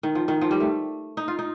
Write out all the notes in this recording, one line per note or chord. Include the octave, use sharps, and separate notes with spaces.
D#3
F3
D#3
F3
G3
A3
D#4
F4
D#4